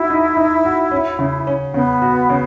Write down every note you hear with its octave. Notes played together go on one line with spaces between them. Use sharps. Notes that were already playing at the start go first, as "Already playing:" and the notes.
Already playing: D#4 E4 F#4
D#4
D#4
F#4
C#4
C#3
C#4
C#3 B3
F#4
C#3